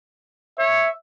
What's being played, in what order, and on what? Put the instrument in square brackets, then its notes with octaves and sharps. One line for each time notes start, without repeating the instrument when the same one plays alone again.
[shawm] C#5 [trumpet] E5